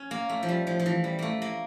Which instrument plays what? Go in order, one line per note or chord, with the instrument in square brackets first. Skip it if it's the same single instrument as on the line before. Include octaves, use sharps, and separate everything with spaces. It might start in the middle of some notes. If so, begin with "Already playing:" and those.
Already playing: [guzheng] C#4
A#3
A3
F3
G3
F3
F3
E3
G3
A3 A#3
A#3